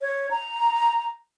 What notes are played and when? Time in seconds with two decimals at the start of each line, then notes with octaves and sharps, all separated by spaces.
0.01 C#5
0.31 A#5